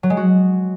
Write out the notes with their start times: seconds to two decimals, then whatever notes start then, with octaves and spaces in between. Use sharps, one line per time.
0.03 F#3
0.10 G#3
0.17 F#4